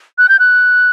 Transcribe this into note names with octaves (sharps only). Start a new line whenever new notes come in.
F#6
G6
F#6